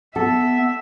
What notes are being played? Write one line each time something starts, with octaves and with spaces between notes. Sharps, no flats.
B3 A4 E5